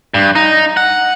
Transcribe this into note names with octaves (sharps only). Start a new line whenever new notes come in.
G2
D#4
F#5